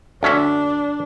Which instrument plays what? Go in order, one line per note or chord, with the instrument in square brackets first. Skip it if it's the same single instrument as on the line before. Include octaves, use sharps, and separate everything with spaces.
[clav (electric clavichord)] D2 C#4 E5 [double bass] D4